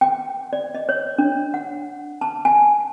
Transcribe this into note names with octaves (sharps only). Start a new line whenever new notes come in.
G5
D5
D#5
C#5
D4
F#5
A5
G#5